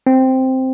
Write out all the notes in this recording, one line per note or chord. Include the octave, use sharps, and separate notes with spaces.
C4